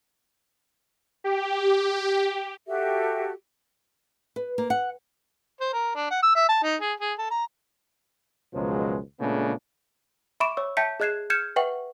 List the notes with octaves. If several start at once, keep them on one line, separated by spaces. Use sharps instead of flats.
G4
F#4 G4 A4 E5
B4
A#3
F#5
C5
A#4
D4
F#5
E6
E5
A5
D#4
G#4
G#4
A4
A#5
C#2 F#2 B2 F3 F#3 G#3
A#2 C#3 G#3 A3 B3 D4
E5 B5 C#6 D6 D7 E7
C#5 C#6 E6
E5 G5 A5 G6 B6 C#7
G#4 D#5 F#6 G#6 C7 E7
F6 G6 G#6 C#7 E7
B4 E5 F#5 G5 C#6 F#7